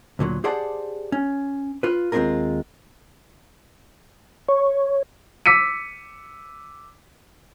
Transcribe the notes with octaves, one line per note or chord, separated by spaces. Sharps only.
D2 A#2 D3 F#3
G4 G#4 C5 D5 F#5 A5
C#4
F4 B4
D#2 G#3 C4 D4 F4 A#4
C#5
D6 E6 B6 C#7 D#7